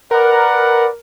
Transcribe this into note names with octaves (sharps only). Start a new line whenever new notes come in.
A#4 B4 D5 F#5